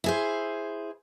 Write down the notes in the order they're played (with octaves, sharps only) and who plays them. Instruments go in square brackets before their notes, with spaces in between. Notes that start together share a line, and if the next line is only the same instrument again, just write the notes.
[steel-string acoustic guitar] E4 G#4 C5